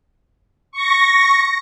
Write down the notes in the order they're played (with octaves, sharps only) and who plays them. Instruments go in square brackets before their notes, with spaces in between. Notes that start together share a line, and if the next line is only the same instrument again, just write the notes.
[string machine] C#6 A#6